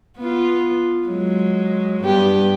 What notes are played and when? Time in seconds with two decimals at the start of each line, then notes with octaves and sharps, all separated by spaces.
0.18 B3 F4
1.07 F#3 G#3
2.04 G2 B3 G4